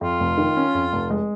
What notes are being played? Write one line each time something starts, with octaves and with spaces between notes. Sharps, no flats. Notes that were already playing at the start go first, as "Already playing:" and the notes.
F2 F4
F1
D#3
C#4
F2
F1
G#3